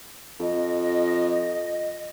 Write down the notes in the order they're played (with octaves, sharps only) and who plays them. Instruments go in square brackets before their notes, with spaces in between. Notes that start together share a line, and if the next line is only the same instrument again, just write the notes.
[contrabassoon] F2 [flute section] D#5